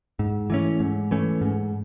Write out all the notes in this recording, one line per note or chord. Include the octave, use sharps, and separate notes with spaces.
G#2
E3 A3 C#4
G#2
E3 A3 C#4
G#2